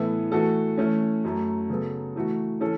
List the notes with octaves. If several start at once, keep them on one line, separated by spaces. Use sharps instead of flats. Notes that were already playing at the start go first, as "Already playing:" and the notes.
Already playing: A2 E3 B3 E4 A4
E3 A3 F#4 A4
E3 A3 C#4
F#2 F#3 A3
C#3 F#3 B3 A4
E3 A3 F#4
E3 C#4 A4